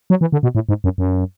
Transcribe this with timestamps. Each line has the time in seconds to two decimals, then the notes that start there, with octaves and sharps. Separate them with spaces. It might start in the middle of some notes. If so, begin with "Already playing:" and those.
0.10 F#3
0.21 E3
0.32 D3
0.43 B2
0.55 A2
0.69 G#2
0.84 F#2
0.98 F#2